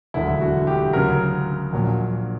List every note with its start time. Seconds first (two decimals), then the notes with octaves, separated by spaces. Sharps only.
0.14 E1 D2 D3 F#3 E4
0.41 F#4
0.67 G4
0.93 D2 C#3 F#3 A#4
1.73 A#1 A#2 F#3